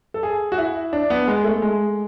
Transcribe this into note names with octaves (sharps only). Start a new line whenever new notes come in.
A4
G#4
F#4
E4
D4
B3
G#3
A3
G#3